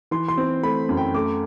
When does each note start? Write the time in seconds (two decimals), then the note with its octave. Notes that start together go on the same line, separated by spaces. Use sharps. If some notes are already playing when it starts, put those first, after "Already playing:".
0.11 E3 C6
0.28 C6
0.38 C4
0.63 A3 B5
0.89 F#2
0.97 G5
1.14 A3 D6